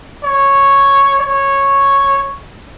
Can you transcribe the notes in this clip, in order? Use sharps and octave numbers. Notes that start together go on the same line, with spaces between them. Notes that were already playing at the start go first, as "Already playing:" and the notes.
C#5
C#5